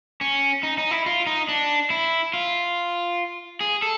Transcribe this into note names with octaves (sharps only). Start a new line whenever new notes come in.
C#4
D#4
D#4
E4
F4
D#4
D4
E4
F4
G#4
A4